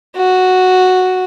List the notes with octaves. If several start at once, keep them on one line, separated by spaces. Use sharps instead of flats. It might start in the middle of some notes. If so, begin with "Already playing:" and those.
F#4